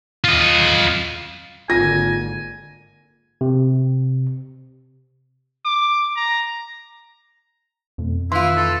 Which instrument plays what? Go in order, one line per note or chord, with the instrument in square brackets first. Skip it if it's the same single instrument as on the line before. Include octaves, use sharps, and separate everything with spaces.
[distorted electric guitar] F4 D#5
[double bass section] G#1 D3 A#3 [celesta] F4 [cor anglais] G#5 [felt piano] A#6
[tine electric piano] C3
[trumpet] D6
A#5
[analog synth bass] F2 [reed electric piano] B2 A3
[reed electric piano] D#3 C6 [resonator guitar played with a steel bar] E3 F4 [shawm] E4
[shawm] A4